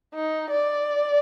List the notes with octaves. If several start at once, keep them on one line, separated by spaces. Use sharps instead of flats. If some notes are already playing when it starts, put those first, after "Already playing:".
D#4
D5